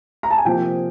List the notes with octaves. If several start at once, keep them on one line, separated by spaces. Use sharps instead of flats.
A#5
A5
G#5
C3 F3 A#3 G5